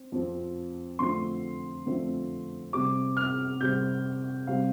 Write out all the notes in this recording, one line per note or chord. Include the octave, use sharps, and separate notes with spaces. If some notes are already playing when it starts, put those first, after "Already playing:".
Already playing: C4
F2 F3 C4
F2 D3 F3 A3 C4 C6
F2 D3 F3 A3 C4
C3 G3 C4 D6
F6
C3 G3 C4 G6
C3 G3 C4 F5